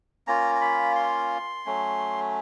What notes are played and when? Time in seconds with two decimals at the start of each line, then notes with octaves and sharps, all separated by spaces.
0.27 A#3 C#4 F4 A#5
0.55 A#5
0.61 B5
0.96 C6
1.66 F#3 A3 C#4